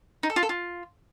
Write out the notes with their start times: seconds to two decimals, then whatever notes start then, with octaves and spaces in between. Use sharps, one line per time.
0.23 D#4
0.30 A4
0.36 F4
0.43 A4
0.49 F4